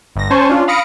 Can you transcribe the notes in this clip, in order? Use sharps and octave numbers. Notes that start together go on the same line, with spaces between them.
G1 A#6
C#4 C5 G#5 A5 C#6
C#4 D4 F4
F5 B5 D#6 A#6 C#7 D7